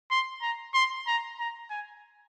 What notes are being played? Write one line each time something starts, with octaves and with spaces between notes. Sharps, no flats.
C6
A#5
C6
A#5
A#5
G#5